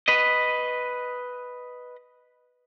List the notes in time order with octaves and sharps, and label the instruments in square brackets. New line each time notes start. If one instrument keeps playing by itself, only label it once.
[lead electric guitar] B4 D#5